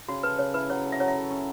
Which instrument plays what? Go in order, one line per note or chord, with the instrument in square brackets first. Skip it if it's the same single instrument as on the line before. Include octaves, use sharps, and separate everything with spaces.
[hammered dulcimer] C#3 [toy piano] F#4
[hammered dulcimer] A4 [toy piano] B4
[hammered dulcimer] C#3 [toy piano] C#5
[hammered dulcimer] E4 [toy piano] B4
[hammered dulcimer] F#3 [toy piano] C#5
[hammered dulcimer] A4
[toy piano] E5
[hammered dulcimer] F#3 [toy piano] C#5
[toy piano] E5
[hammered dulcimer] A4
C#4